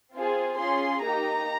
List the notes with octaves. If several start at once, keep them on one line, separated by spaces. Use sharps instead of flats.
C4 F4 G#4
C#4 F4 G#4 C6
A#3 D#4 G4 A#5